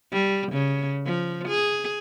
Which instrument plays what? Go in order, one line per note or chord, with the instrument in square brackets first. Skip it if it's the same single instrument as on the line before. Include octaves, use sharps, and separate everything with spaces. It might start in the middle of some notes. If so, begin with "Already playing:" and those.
[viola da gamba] G3
C#3
F3
G#4